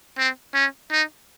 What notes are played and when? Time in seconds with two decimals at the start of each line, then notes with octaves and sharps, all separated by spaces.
0.18 C4
0.54 C#4
0.91 D#4